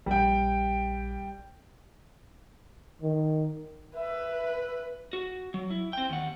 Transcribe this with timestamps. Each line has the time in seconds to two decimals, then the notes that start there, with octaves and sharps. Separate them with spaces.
0.06 A#1 G3 G5
3.02 D#3
3.96 B4 E5
5.13 F#4
5.54 F#3
5.70 E4
5.93 C4 G5
6.10 D#2 F#5